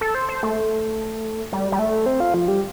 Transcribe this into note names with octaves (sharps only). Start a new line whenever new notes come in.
A4
C5
C5
A3
G3
G3
A3
C4
F4
F3
G3